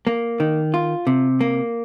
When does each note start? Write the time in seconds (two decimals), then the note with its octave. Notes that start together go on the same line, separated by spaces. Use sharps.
0.07 A#3
0.40 D#3
0.74 F4
1.07 C3
1.41 A#3